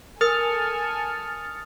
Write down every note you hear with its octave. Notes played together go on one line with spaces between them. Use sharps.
A4 A#4 G#5 D#6 F6 A6 C#7